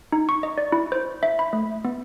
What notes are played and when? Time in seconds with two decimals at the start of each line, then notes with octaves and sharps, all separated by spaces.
0.12 D#4
0.29 C#6
0.43 D#5
0.58 D5
0.72 E4
0.92 C5
1.23 E5
1.39 B5
1.53 A3
1.85 B3